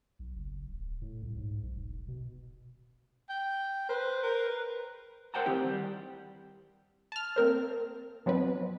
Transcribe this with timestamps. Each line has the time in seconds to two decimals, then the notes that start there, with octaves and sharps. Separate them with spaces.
0.19 B1
0.36 F#1
0.68 D1
1.02 A2
1.22 C2
1.38 G#2
1.63 B1
1.76 E1
2.08 B2
3.29 G5
3.89 B4 C5
4.23 A#4
5.34 A#4 C5 F#5 G5 A5 A#5
5.46 D#3 C4 E4 G4
5.66 G3
7.12 A5 F6
7.36 A#3 C4 A#4 C5
8.26 F3 F#3 B3 C4 D#4 B4